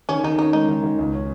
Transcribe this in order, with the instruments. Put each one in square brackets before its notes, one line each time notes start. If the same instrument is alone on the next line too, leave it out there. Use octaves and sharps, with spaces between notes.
[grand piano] D#3 [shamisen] C#4
[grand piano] D#3 [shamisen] D#4
[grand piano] C#4 [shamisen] D#4
[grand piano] G#3 [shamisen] D#4
[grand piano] D#3
D#3
C#2
C#4